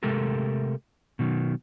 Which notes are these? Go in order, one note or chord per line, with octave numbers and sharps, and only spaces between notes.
C3 G#3 A3 G4 A4 A#4
B2 D#3 F#3